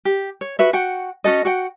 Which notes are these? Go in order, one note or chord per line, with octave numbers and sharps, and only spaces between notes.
G4
C#5
F#4 B4 E5
F#4 F#5 G5
C#4 F#4 A4 D#5
F#4 F#5 G5